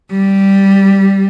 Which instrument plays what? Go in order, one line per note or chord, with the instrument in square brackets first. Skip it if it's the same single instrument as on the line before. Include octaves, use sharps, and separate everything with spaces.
[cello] G3